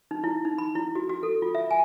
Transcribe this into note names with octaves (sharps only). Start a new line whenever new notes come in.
D#4
E4
D#4
B5
E4
F#4
F#4
A4
F4
E5
G#5